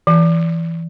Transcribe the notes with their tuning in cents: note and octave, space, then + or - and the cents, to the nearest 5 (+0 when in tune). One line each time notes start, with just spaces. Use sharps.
E3 +10